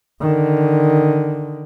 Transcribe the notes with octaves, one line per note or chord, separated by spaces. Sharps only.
D3 D#3